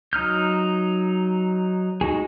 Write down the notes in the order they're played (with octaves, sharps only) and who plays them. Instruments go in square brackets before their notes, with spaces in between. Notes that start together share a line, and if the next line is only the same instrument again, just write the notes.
[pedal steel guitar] F#3 D#4 F6 G6
G#3 D#4 F#4 G#4